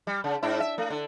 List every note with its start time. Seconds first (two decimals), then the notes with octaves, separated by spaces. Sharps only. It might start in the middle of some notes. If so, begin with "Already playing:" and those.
0.07 G3
0.24 C#3
0.43 G#2 D4 E4
0.60 E5
0.78 A3
0.90 D3